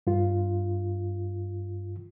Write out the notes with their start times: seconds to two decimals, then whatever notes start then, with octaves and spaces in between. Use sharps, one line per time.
0.07 G2 F4